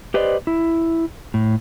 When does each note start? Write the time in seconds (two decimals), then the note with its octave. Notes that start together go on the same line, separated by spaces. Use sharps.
0.14 G4 B4 C5 D5 D#5
0.47 E4
1.34 A2